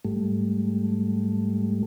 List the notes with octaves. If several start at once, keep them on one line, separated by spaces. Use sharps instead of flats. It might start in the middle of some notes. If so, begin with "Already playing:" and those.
G#2 G3 A3